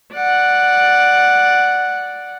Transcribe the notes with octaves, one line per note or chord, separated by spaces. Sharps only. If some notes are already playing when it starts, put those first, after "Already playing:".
D5 F#5